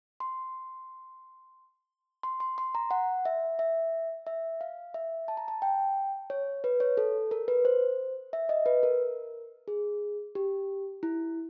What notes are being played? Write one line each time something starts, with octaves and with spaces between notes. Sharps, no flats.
C6
C6
C6
C6
A#5
F#5
E5
E5
E5
F5
E5
A5
A#5
A5
G5
C#5
B4
C#5
A4
A#4
B4
C5
E5
D#5
B4
A#4
G#4
G4
E4